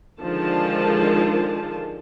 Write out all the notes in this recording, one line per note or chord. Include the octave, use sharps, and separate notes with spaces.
D3 D#3 F3 G#3 F4 A5